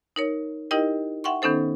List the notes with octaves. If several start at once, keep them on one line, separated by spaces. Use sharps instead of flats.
D#4 A#4 C#5
D#4 E4 G4 A#4 D#5 G5
E5 F#5 G5 C6 C#6
D#3 B3 C#4 D#4 A4 C5